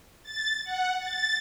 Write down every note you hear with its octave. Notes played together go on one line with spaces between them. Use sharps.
A6
F#5
A6